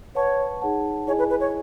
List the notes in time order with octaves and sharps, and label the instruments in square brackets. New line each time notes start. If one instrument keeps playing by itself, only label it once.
[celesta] B4 F#5 A5 C#6 [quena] C#5
[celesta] D#4 G#4 C#5 F#5 A5
[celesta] E4 G#4 D#5 G#5 [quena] C#5
[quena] B4
B4
C#5